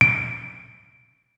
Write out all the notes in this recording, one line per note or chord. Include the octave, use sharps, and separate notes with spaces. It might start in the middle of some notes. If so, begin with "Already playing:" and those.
D7